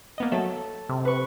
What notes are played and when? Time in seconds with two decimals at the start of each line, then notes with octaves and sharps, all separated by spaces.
0.18 A#3 B3 D#5
0.32 F#3 A3 A4
0.89 C3
1.05 B4 C#6